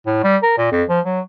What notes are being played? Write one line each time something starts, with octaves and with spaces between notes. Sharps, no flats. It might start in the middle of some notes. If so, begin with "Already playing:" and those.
A2
G3
A#4
A#2
F2
F3
F#3